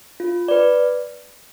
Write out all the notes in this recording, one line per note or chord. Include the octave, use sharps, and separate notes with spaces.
F4
B4 D5